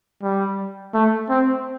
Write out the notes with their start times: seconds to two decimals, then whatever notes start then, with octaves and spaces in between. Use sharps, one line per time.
0.23 G3
0.94 A3
1.29 C4